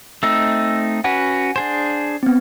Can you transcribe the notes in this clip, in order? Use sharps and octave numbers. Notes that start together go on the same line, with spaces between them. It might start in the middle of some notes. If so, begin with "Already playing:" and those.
A3 C4 D#4 E6
C#4 F#4 B4 F#5 G#5
D4 G#4 C5
B3 C4